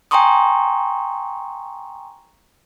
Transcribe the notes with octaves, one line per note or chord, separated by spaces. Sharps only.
G5 G#5 A#5 C6 C#6 D#6